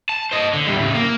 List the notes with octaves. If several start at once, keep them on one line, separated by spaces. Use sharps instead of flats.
A5
C5 D#5
D3
E2 G3
A2 C#3
A#3